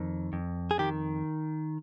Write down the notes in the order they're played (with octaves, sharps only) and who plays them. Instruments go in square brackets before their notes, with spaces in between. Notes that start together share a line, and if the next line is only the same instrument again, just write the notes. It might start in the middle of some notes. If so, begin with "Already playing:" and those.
Already playing: [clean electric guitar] F2 D#3
F2
G#4
D#3 G4